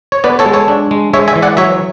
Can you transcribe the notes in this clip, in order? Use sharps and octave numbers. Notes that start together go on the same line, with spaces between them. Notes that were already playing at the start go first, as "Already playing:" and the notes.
C#5
B3 B4 D5
A4 C#5
G#3
A4 C#5
D4
G#3
G#3 C#5 E5
E5 G#5
E3
D5 F#5
F#3 C#5 E5